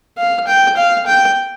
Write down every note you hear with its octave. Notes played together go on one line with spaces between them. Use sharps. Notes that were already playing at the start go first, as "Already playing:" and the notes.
F5
G5
F5
G5